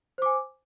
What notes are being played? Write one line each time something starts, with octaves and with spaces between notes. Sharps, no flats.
C5 G#5 D6